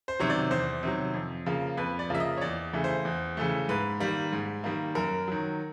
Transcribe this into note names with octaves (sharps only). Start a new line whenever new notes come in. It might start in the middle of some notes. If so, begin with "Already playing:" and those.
C5
C3 D#3 F#3 C#5
D5
E2 C5
C3 D#3 F#3
F2
C#3 F3 A#3
F2 B4
D5
C#3 F3 A#3 E5
D#5
C#5
E2 D5
C#3 E3 A3
C5
E2
C#3 E3 A3
G#2 B4
D#3 G3 A#3
G#2
D#3 G3 A#3
F#2 A#4
D#3 F#3